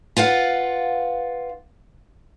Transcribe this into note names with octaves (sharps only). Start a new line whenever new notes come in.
F4 B4 F5 F#5